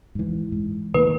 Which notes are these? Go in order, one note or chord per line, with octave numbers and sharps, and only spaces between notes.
G#2 E3
G#2
D#3 A#3 B4